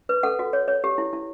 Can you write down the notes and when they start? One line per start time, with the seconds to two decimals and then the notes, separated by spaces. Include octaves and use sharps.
0.09 B4
0.23 A4 F#5
0.39 F#4
0.53 C#5
0.68 C#5
0.84 G4
0.98 E4
1.13 E4